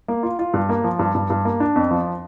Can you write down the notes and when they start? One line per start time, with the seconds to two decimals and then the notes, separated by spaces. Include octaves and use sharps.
0.08 A#3
0.23 F4
0.39 F4
0.54 G2
0.69 A#3
0.84 F3
0.99 G2
1.15 G2
1.30 G2
1.45 A#3
1.60 D4
1.76 F2
1.91 F3